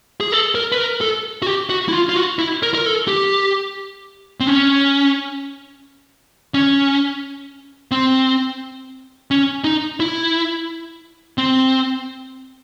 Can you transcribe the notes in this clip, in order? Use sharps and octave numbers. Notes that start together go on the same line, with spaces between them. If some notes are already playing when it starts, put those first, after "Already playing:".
G#4
A4
A#4
B4
A#4
A4
F#4
G4
F#4
E4
F4
F4
F#4
E4
A#4
A#4
A4
G4
C4
C#4
C#4
C4
C#4
D#4
E4
C4